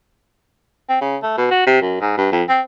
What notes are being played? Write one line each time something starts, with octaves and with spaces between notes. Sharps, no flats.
C4
C#3
A3
B2
F#4
C3
F#2
G#2
G2
F2
C4